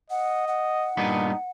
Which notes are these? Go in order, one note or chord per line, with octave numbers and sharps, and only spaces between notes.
D#5 F#5
F#5
G2 A#2 B3 D#4